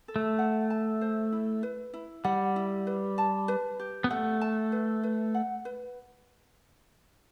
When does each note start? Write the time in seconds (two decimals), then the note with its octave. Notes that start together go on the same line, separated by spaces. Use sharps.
0.08 A4
0.16 A3
0.39 F#5
0.70 A5
1.01 C5
1.32 E4
1.63 B4
1.94 E4
2.24 G3 F#5
2.56 E4
2.87 B4
3.18 A5
3.48 B4
3.79 G4
4.04 B3
4.11 A3 F#5
4.41 A5
4.72 B4
5.03 B4
5.34 F#5
5.65 B4